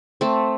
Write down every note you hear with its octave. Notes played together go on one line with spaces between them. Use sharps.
A3 C4